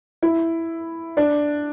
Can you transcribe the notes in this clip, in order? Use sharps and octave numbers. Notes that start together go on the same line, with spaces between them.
E4
D4